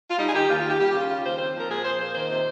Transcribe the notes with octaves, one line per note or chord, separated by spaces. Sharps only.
F4
G3 D#4
G#4
D#3 G4
D#2 F4
D#2 F4
G4
G3 G4
C#3 F4
C#4 F4
D#2 C5
C4 C5
F3
A#4
A#2 G#4
A#2 C5
A#3 C5
D#3 C5
C3